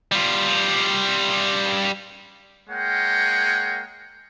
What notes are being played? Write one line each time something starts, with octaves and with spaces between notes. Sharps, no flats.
G3 F4
G#3 A#3 A#4 C#5 F#5 G5